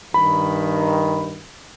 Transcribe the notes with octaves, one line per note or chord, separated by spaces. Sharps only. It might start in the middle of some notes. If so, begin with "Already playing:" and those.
G2 D#3 B5